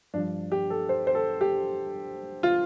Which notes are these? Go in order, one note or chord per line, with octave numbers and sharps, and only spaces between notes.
G2 F3 D4
G4
A4
C5
C5
A4
G4
F4